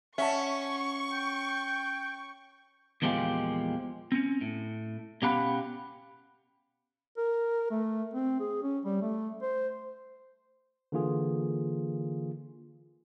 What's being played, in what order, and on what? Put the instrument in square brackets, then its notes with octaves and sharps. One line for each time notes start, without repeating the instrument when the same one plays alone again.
[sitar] C#4 [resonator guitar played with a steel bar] E5 F#5 A5 [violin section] C#6
[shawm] G5
[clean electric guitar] E2 A#2 F3 G#3 G4 F5
C4 C#4
A2
B2 C#4 G4 F5 F#5 B5
[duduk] A#4
A3
C4
G#4
C#4
G3
A3
C5
[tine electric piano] D3 E3 A#3 F4 G#4